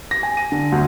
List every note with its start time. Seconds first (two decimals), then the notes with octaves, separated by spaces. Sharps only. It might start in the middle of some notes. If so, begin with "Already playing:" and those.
0.11 A#6
0.23 G#5
0.37 D#7
0.52 D3
0.72 D2